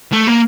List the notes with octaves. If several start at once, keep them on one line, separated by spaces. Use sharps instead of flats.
A3
A#3